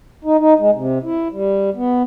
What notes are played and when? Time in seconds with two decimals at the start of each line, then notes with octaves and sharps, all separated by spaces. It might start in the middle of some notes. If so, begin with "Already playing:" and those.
0.25 D#4
0.38 D#4
0.59 G#3
0.74 C3
1.03 E4
1.32 G3
1.76 B3